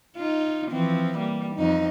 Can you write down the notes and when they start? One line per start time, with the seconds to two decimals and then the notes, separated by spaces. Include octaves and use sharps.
0.17 D#4 F4
0.72 E3 F3 C4
1.18 G3 A#3
1.55 F2 D#4